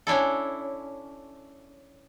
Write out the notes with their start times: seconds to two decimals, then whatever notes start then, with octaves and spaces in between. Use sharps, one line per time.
0.07 C#4 D4 E4 A4